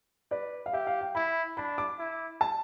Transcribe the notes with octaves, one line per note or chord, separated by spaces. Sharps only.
B4 D5
F5
G4 E5
F5
G5
E4 B5
D4 B5
D6
E4
A5